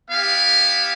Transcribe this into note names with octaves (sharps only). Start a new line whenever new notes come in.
B3 E4 G4 F5